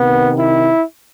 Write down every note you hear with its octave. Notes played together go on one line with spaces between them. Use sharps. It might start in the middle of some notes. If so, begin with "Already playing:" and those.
Already playing: C3 D#3 B3
E4